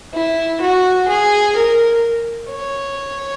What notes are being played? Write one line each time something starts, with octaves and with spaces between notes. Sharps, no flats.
E4
F#4
G#4
A#4
C#5